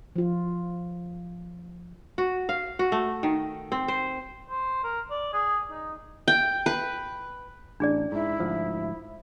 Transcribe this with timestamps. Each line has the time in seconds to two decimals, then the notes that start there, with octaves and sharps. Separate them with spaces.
0.16 F3 F4
2.18 F#4
2.49 F5
2.79 F#4
2.92 A3
3.23 D#3
3.72 C4
3.88 C5
4.50 C5
4.83 A#4
5.10 D5
5.33 G#4
5.71 D#4
6.28 G5
6.66 B4
7.80 A1 D4 G#4 D5
8.12 G#2 E4
8.40 D2 G#2 F3